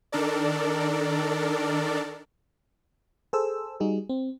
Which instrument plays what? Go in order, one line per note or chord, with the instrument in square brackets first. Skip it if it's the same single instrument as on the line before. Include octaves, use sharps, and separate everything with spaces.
[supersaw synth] D#3 D4 A4 A#4 D5
[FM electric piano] G#4 A4 C5 E6
G3 D#4 F#4 G#4
C4